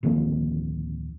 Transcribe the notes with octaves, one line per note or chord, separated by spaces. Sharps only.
D1 F2 D#3 A#3